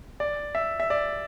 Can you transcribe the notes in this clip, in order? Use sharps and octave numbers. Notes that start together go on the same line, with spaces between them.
D5
E5
E5
D5